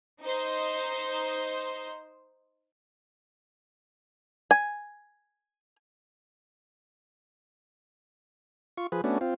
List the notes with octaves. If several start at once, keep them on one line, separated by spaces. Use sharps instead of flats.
D#4 C5
G#5
F4 C#6
F3 G#4 B4
A3 B3 C#4 D4 F#4
C4 F4